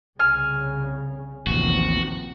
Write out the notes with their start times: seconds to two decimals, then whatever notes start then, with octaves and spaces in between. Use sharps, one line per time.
0.19 C2 C#3 G#5 F6
1.47 A1 D#2 C3 F3 F#4